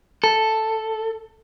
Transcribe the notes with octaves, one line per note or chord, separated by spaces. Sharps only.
A4